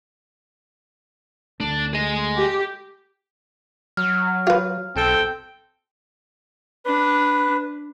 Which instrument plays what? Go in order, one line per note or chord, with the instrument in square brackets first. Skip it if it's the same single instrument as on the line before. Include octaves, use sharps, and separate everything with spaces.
[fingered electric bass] D2 A3 [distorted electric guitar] D4
[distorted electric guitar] G#4 D#5
[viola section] G4
[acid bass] F#3 [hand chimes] F6
[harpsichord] F4 B4
[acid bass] B1 [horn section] C4 A4 G5
[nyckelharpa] D4 [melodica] B4